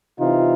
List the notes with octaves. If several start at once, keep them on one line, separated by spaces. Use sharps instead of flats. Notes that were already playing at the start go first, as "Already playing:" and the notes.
C3 E3 D#4 F4